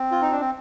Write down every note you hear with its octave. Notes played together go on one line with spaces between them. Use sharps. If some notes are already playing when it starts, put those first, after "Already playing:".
Already playing: C4
F4
D#4
D4
C4